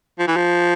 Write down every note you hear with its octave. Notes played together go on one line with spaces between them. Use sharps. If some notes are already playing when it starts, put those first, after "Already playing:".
F3
E3
F3